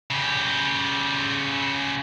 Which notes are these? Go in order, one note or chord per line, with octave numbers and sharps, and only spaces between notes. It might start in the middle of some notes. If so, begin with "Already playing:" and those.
C#3 G4